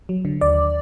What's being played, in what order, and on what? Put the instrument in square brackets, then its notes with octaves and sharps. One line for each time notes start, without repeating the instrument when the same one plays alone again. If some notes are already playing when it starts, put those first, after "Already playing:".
[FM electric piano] F#3
D3
D#2 D5